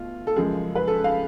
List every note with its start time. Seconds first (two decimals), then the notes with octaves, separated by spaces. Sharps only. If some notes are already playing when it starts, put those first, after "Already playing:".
Already playing: B2 A3 F4
0.27 A4
0.36 F#2 C#3 F3 G#3 G#4
0.75 B4
0.88 A4
1.04 F5